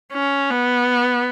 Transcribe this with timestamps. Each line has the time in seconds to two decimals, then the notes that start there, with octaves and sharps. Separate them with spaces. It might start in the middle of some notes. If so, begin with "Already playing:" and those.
0.13 C#4
0.51 B3